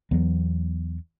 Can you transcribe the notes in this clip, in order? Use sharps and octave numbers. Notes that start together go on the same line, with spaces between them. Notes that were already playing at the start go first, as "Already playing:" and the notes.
E2 E3 F#3 B3